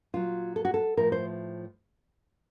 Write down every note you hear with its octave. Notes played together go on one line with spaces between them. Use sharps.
A#2 F#3 F4
A4
F#4
A4
A2 F3 A#4
C5